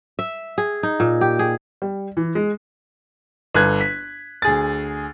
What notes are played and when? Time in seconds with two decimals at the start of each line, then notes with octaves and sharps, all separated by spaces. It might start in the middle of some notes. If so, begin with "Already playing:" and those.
0.19 E5
0.58 G#4
0.83 D#4
1.00 A#2
1.21 G4
1.39 G#4
1.82 G3
2.17 E3
2.35 G#3
3.55 G1 A4 F#6 G#6
3.81 B6
4.42 D2 G#4 A6